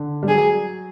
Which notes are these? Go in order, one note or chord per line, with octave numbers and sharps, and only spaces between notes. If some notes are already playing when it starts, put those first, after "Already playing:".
Already playing: D3
G3
F#3 G#4